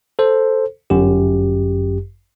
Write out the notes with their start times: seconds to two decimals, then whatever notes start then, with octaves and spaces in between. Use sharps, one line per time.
0.19 A4 C5
0.90 G1 F#2 G4